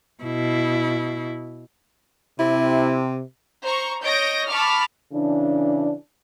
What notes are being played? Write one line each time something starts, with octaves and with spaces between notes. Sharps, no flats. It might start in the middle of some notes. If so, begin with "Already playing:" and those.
B2 E4
C3 E4
C5 A#5 C#6
C#5 D#5 G6 A#6 D7
A5 B5 C#6 D6 F6
C#3 E3 D4